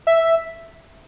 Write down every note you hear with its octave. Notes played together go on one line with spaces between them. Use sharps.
E5